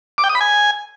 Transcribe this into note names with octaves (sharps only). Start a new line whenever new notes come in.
D6
G5
D#6
B5
G#5